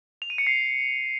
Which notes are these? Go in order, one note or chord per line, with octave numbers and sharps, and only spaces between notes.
F7
D#7
C#7
C7